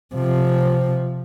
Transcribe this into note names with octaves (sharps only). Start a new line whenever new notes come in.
C3 F3